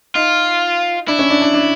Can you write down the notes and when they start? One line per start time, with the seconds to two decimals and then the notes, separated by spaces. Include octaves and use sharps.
0.15 D#4 F4
1.08 D4 E4
1.19 C#4
1.30 D4
1.42 D4
1.54 D4